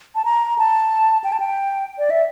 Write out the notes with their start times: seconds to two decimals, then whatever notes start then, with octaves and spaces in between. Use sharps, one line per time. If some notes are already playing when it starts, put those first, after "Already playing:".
0.15 A5
0.25 A#5
0.59 A5
1.24 G5
1.32 A5
1.40 G5
1.98 D5
2.10 E5